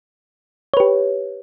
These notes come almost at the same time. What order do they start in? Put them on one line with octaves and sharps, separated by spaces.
C#5 B4 G4